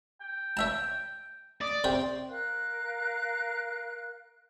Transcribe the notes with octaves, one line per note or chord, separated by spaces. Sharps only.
G5
C#5 E5 A5
D5 D#5
C3 C5 C#5 G5
A#4 F5 F#6